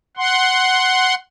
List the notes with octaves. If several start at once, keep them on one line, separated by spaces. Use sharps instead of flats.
F#5 C6